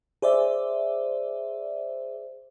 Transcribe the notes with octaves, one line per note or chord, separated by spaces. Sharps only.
G#4 C5 D5 E5